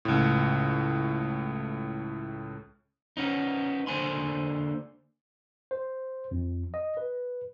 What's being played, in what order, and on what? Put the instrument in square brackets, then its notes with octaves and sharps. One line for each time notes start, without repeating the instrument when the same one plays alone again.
[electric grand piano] C#2 A2
[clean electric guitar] B3 C#4 D#4
D3 A#3 C5 G#5 B5 C6
[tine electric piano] C5
F2
D#5
B4